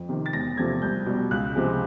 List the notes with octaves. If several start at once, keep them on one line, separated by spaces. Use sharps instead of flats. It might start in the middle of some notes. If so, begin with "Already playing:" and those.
Already playing: F2
C3 D#3
A6
E1 A#6
E2 C3 F3 A3 G#6
C2 G6
B2 G3
C#2 F#6
C3 F3 G#3